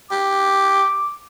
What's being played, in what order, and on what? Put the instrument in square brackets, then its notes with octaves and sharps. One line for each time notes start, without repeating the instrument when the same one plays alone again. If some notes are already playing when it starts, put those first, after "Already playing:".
[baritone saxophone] G4 [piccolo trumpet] D6